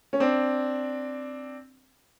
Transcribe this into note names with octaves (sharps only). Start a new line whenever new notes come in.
C#4
C4 D4